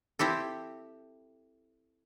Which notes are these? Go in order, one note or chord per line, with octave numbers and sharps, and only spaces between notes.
C4 E4 G4 A4